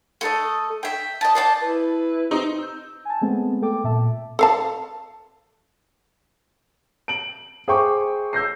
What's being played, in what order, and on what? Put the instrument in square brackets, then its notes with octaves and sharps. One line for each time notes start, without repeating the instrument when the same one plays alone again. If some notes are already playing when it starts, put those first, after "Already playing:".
[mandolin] A3 A4 D#5
E5 G5
D#5 A5
C5 D5 A5
[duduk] E4 [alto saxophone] B4
[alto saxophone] C4 [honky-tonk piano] D#4
[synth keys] E6 G6
G#5 A5
G#3 A3 B3 C4
A3 A4 G5 D6
A#2 E5 A5
[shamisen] A4 F5 A5
[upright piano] D7 F#7
G#4 C5 E5 G5 C#6 D6
E6 G6 A#6 C7